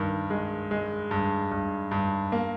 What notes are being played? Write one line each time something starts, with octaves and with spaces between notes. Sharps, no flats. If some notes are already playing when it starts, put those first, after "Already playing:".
Already playing: G2 D#3
G#3
G#3
G2
G2
G2
A#3